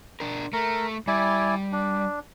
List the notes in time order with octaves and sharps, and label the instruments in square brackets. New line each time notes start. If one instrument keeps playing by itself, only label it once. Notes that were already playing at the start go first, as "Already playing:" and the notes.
[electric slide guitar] D4 A#4
[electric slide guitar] A3 [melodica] A#4
[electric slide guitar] G3 [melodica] E4 D5 G#5
[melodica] D4